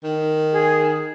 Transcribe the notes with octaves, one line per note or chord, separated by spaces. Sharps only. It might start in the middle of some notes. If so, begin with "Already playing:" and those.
D#3
G#4